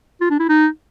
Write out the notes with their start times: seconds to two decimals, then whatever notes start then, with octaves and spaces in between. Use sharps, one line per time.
0.21 F4
0.30 D4
0.40 E4
0.49 D#4